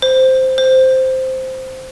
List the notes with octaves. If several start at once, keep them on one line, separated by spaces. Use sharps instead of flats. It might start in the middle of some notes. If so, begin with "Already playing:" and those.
C5
C5